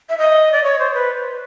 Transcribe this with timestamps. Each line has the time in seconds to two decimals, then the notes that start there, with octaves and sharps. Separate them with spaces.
0.09 E5
0.18 D#5
0.52 D5
0.64 C#5
0.79 C5
0.94 B4